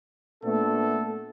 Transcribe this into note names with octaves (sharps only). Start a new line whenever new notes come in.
A#2 A3 B3 D4 A4